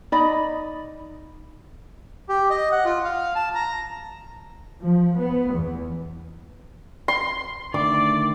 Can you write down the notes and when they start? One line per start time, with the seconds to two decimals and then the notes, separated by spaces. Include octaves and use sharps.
0.12 D#4 D5 D#5 B5
2.29 G4
2.50 D#5
2.72 F#5
2.85 F4
3.05 F5
3.35 A5
3.55 A#5
4.83 F3
5.19 B3
5.53 E2
7.08 C6
7.74 D3 D#3 A3 D5 D6